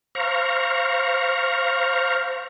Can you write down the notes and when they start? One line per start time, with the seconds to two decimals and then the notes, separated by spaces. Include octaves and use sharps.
0.15 C5 F5 A#5 C#6